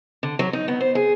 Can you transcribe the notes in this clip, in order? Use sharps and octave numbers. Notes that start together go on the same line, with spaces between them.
D3
F#3
D#4
B3
C5
G#4